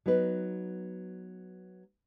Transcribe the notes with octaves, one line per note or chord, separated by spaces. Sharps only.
F#3 B3 D#4 B4